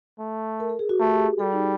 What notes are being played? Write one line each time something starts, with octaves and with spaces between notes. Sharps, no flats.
A3
A#4
A4
G#4
F#4
A3 G4
G4
G#4
G3 A4
D#4